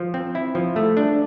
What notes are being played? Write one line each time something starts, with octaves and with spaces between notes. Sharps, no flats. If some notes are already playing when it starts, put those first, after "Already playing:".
Already playing: F3
C4
E4
F3
A3
D4